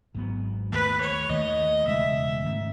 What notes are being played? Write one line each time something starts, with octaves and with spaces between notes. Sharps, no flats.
G#1 G#2 F#3 B3
D#2 D#3 A3 B4
C#5
D#2 D#3 F#3 A3 D#5
E1 E2 C#3 G#3 E5
G#2 D#3 A3 C#4